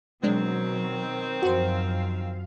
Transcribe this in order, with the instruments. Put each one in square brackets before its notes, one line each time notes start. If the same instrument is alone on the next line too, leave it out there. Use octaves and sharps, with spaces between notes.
[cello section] B2 F#3 [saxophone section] D#3 C4 [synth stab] G#3 D4
[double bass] F#2 [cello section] F3 F5 [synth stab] F#4 C5